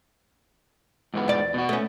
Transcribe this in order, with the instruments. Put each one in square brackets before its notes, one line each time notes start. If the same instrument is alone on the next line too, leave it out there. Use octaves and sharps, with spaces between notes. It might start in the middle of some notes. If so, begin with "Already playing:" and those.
[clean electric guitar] G#2 E3 B3
[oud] E2 D5
[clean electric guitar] B2 F#4
[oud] A3 C#4